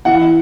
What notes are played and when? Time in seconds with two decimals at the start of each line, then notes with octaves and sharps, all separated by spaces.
0.05 E3 F#5